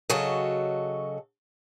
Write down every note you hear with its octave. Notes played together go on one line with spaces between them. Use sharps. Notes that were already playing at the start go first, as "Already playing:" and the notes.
C#3 F#3 F#4 A4 D#5